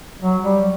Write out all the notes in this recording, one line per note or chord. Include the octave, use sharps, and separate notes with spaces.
F#3
G3